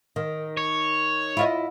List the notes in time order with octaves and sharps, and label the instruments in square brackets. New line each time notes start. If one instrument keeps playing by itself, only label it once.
[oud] D#3
[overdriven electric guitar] C#5
[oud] E4 F4 D#5